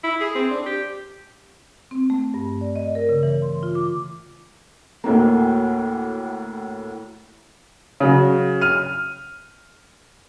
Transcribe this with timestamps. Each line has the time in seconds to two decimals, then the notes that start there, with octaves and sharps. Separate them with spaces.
0.04 E4
0.21 G#4
0.35 C4
0.51 D4
0.66 G4
1.91 C4
2.10 A3
2.34 G2
2.61 D5
2.76 D#5
2.95 A#4
3.09 C#3
3.23 E3
3.42 C6
3.63 F4
3.75 D6
5.04 D2 A2 A#3
8.00 C#3 F#3
8.61 F6 D#7